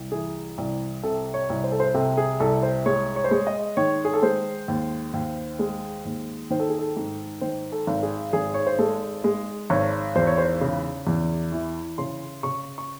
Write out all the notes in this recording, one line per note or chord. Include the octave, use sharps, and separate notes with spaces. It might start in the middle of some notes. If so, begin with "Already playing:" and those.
Already playing: C2
E3 G#4
C2
C3 A4
C#5
C2
C5
A4
C5
C3 A4
G#4
C2 A4
C5
G#3 C#5
C#5
C5
G#3 C#5
D#5
D#3 C#5
G#4
A4
G#3 C5
D#2
D#2
G#3
D#2
D#3 C5
A4
G#4
A4
G#2
D#3 C5
A4
G#1
G#4
G#1 G#4
C#5
C5
G#3 A4
G#3
G#1 C#5
E2 C5
C#5
C5
C#3
E2
E3
C#3 C6
C#3 C#6
C#6